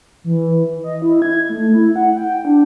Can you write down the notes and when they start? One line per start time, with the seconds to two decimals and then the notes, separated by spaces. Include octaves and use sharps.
0.24 E3
0.84 D#5
1.02 E4
1.22 G#6
1.49 A3
1.74 E4
1.96 F#5
2.17 G5
2.45 D4